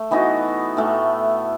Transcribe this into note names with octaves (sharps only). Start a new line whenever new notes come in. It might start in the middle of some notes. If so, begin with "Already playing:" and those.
Already playing: A3
E3 B3 D#4 F#4
A2 E3 A3